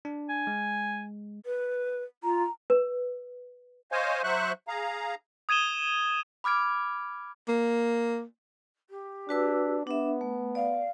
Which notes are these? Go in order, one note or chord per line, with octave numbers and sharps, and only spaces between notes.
D4
G#5
G#3
B4
F4 A#5
B4
C5 C#5 D#5 F5 G#5
F#3 C5 E5 C#6 F#6
G#4 F5 A#5
D#6 G#6 D#7 E7 G7
B5 D6 F6 G#6 D7
A#3
G4
D4 F#4 B4 E6
B3 D4 E5
A3
D5 F5